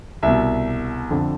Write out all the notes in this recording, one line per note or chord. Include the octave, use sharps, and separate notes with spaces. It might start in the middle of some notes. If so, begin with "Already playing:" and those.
C2 B2 E5
F2 D3